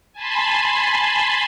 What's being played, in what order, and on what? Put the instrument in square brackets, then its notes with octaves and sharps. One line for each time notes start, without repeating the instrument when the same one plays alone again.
[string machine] G#5 A5 B5 C6